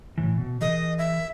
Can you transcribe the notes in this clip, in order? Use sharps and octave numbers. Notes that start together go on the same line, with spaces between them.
A2 E3
B2
E3 G#4 A#4 D#5
E5